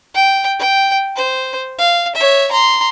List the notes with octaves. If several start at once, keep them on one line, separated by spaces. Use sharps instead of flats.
G5
G5
C5
F5
C#5 E5
A#5 C6